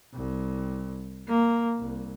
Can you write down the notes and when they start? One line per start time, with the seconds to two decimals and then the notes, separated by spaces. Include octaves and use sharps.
0.14 C2
1.28 A#3
1.79 C2